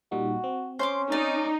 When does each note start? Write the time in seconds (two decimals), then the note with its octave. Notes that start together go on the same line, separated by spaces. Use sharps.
0.12 A#2 G3 D#4 F#4
0.44 C4
0.79 C#4 C5 C6 D6
1.12 D#4 D5